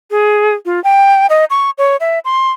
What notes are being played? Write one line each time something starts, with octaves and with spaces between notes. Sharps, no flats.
G#4
F4
G5
D#5
C#6
C#5
E5
C6